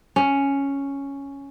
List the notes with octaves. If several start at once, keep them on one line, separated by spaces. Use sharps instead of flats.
C#4